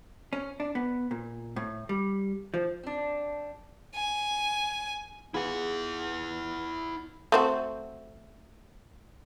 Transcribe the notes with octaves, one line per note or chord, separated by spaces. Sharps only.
C#4
D4
B3
A#2
A2
G3
F3
C4 D4
G#5
B3 E4 F4 G#4 F#5
A3 C4 F#4